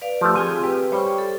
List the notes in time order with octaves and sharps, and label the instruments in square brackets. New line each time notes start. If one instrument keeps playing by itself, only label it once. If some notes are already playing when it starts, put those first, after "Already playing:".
[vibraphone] B4 D5 F5
[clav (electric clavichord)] F3 A3 [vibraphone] G4
[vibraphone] C4 F4 G#4 [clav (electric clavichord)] A4 G#5
[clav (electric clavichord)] G4 [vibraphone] B4
[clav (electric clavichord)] G3 C5 [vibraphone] C#5 G5 C#6
[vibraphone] A4